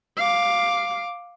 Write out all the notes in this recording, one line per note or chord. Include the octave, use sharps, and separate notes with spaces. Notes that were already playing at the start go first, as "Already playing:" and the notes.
F5 D6